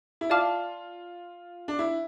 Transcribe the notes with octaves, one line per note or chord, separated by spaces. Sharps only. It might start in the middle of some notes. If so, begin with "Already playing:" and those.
E4
F4 D5 F5 A5 D6 F6
D4
E4